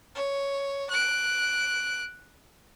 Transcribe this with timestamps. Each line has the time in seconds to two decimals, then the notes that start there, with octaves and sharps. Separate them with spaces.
0.15 C#5
0.90 F#6 D7